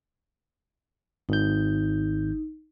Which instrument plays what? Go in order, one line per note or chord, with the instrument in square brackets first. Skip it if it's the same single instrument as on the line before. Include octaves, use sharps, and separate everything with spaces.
[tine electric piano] G#1 G6 [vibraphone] D#4